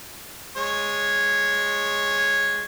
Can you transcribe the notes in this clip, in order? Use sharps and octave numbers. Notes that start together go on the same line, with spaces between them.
G#3 C#5